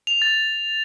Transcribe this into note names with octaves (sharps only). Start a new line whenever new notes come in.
F7
A6